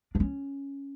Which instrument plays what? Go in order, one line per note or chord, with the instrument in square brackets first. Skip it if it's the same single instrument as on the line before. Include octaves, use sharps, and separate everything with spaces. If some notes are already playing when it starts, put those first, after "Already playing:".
[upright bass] D4
C#4